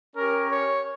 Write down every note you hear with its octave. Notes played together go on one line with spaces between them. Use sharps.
C#4 G4 A#4
C#5